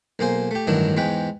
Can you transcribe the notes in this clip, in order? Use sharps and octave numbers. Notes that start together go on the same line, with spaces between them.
B1 A#3 G#4 C5
A3 G4
A1 G2 D#3 F#3 D4 E4
E2 G#2 G#3 B4 G5